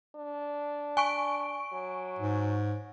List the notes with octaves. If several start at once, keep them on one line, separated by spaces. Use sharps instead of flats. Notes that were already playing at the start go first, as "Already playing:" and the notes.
D4
G#5 C#6 D7
F#3
G#2